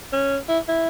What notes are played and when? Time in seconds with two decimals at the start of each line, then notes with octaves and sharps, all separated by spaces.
0.12 C#4
0.49 E4
0.68 E4